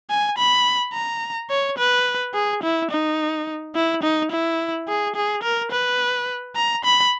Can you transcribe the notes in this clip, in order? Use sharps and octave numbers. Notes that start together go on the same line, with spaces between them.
G#5
B5
A#5
C#5
B4
G#4
E4
D#4
E4
D#4
E4
G#4
G#4
A#4
B4
A#5
B5